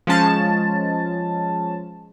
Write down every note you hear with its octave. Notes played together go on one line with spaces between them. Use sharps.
F3 G#3 C#4 A5